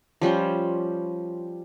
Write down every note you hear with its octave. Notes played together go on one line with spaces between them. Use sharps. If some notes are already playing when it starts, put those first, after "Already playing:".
F3 G3 C#4 C5